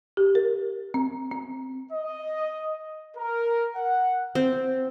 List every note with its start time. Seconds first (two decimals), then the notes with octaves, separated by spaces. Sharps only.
0.17 G4
0.35 A#4
0.94 C4
1.32 C4
1.92 D#5
3.17 A#4
3.76 F#5
4.35 C4